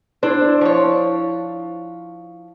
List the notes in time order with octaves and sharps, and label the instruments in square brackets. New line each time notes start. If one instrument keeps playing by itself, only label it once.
[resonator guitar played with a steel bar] D4 [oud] E4 C5
[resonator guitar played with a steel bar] F3 C#5